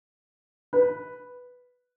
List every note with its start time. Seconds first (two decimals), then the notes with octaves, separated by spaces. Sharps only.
0.73 B4